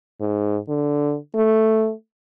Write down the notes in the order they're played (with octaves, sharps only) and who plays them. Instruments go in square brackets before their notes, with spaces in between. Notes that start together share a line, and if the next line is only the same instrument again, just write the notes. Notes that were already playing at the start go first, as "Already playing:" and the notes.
[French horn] G#2
D3
A3